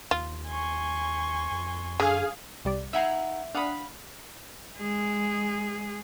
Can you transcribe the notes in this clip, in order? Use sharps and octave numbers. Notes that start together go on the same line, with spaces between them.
D#2 F4
G#5 C6 C#6
F2
F#2 D3 G#4 F5
C2 G3 D5
D#4 E4 E5 F#5 A#5 E6 G#6 C7
D4 F5 F#5 B5 D#6
G#3 G#4